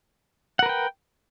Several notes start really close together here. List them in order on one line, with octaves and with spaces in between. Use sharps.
F#5 A#4 B4 G5